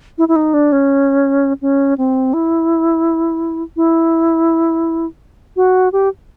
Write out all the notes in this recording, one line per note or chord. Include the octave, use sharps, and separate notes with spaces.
E4
E4
D#4
D4
C#4
C#4
C4
E4
E4
F#4
G4